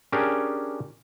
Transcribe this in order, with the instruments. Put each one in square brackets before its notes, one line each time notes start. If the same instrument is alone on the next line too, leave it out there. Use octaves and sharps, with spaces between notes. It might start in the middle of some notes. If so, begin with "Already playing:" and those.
[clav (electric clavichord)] C#4 D4 G4 G#4 A#4